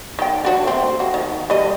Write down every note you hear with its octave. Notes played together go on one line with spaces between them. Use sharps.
D#3 G5
D4 F#4 C#5
A3 C4
F#4
D#3
G3 D#5